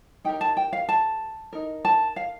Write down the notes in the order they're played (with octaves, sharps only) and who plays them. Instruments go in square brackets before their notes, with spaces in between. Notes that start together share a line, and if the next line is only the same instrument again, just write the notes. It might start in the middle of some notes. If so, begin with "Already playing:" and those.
[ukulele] D#4 G4 A#4 G5
A5
G5
F5
A5
D#4 A#4
A5
F5